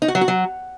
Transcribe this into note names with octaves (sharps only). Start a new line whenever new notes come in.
D#4
F#4
F#3
F#4
F#3